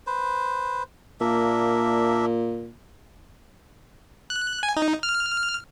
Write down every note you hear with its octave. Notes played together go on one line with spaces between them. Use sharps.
B4 C5
A#2 A#3 D4 E5
F#6
G#5
D#4
F6